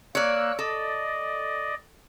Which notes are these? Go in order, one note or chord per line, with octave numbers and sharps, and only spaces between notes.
A#3 C#5 D5 E6 F#6
A4 D5 D#5